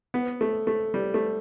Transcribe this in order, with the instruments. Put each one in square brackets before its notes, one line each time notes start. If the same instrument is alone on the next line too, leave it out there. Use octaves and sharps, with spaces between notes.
[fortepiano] B3
A3
A3
G3
A3